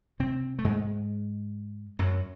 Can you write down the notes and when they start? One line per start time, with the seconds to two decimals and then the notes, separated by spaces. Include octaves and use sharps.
0.20 C3 C4
0.59 A3
0.64 G#2 G#3
1.99 F#2 F#3